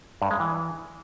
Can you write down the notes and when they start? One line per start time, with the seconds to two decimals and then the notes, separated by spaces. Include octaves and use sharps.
0.22 G2
0.31 G#3
0.40 E3